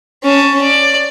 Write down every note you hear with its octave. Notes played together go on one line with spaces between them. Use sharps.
C#4 A5
D5